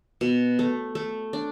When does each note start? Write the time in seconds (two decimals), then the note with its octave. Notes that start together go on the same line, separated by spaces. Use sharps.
0.21 B2
0.59 A3
0.95 A3
1.33 D4